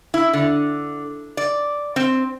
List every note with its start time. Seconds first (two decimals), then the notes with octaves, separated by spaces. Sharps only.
0.14 E4
0.33 D3
1.37 D5
1.96 C4